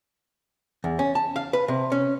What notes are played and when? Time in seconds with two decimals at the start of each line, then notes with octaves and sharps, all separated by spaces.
0.84 E2
0.99 C#4
1.15 A5
1.36 F5
1.53 B4
1.68 C3
1.92 C#4